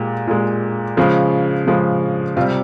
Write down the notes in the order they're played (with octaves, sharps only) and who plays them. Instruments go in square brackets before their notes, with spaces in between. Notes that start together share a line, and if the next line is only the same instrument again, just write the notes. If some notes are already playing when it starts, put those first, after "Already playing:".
Already playing: [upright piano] A#2 G#3 G4
A#2 G#3
C#3 F3 G#3
C#3 F3 G#3
C3 G3 F4